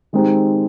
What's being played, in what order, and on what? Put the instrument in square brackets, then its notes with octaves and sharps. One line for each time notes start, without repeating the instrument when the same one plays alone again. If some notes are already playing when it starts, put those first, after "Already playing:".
[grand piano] D#3 G#3 C4 D#4 G4